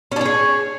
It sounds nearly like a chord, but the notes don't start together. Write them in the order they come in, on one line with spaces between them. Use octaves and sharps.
C#4 D4 C#5 G#4